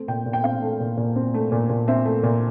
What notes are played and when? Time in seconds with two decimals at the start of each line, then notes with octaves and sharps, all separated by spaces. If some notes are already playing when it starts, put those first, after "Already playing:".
Already playing: A3 C4
0.08 A#2 G5
0.26 A#2
0.33 G5
0.44 C4 F5
0.62 A3
0.80 A#2
0.97 A#2
1.16 C4
1.34 A3
1.52 A#2
1.70 A#2
1.88 C4 E5
2.05 A3
2.23 A#2